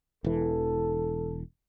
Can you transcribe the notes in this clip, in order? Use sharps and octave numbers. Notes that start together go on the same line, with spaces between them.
E1 E3 A4